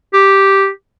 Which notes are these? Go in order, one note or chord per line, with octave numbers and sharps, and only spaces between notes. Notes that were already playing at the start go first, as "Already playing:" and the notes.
G4